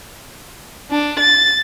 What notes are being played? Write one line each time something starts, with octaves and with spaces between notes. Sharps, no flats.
D4
A6